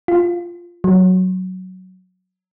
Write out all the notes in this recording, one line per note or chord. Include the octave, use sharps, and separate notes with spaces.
F4
F#3